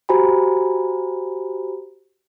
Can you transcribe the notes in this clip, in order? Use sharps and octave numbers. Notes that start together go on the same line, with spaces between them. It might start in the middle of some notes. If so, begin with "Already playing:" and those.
F#4 G4 C5 G#5 A#5 B5